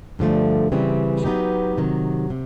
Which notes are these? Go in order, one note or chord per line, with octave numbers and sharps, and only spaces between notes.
G2 D3 F3 A3
C#3 E3 G3 C4
F#3 B3 D#4 G4
C3 D#3 F#3
C3